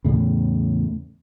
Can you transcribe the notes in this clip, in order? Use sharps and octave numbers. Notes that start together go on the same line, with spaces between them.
E2 A2 C#3